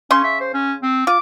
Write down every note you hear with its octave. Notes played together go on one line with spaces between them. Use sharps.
C#3 C#4 C6 C#6
E5
C5
C#4
C4
F4 D6